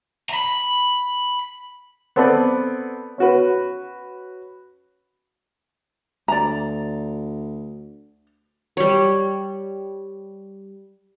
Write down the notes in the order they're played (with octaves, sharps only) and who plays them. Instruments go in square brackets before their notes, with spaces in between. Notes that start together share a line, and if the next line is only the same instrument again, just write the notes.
[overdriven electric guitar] A#5 B5
[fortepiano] B3 C4 A4 B4 D5
C#4 F#4 B4
[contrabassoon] D2 [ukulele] D5 A#5
[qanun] G3 C#5